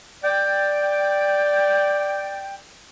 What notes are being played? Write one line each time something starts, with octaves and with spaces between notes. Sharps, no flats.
D5 G5